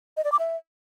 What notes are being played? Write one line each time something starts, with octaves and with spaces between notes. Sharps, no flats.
D#5
D5
D6
E5